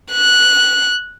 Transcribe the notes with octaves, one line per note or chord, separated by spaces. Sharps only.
F#6